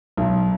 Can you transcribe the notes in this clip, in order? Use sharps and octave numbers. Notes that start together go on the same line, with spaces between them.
B1